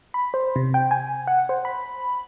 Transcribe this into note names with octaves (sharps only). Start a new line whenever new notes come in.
B5
C5
C3
G5
G#5
F#5
C5
B5